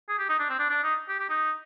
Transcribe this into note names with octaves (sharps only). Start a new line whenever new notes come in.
G#4
G4
D#4
D4
C4
D4
D4
D#4
G4
G4
D#4